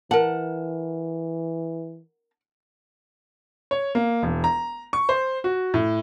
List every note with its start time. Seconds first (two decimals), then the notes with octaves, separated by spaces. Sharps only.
0.11 E3 A#4 F#5 A5
3.71 C#5
3.95 A#3
4.23 E1
4.44 A#5
4.93 C#6
5.09 C5
5.44 F#4
5.74 A2